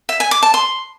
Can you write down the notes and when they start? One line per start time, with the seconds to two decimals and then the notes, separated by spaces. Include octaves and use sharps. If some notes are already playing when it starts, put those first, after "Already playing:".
0.09 E5
0.20 G#5
0.31 D6
0.43 A5
0.54 C6